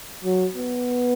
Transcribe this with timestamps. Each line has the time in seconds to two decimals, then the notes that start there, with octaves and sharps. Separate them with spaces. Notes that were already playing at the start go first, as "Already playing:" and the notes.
0.24 F#3
0.55 B3